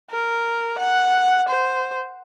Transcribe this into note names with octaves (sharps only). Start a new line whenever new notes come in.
A#4
F#5
C5